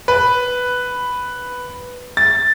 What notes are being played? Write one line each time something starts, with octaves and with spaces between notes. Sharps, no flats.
B4
A6